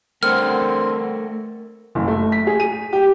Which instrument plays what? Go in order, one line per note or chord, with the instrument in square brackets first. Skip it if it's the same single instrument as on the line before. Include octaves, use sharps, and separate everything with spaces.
[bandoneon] D3 C4 [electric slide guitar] A3 A#4 F#5 [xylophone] F6
[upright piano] F#1
A3
B6
G#4
D#7
G4